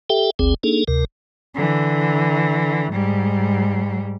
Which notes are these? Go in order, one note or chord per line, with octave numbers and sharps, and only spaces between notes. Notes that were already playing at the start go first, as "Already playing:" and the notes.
G4 A4 E5 G5
G1 D2 C4 G#4
A#3 D4 D#4 G#4 A4
D2 C3 A#4
D3 E3
G#2 G3